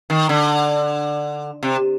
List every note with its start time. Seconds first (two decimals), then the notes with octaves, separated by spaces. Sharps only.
0.10 D#3
0.29 D3
1.63 C3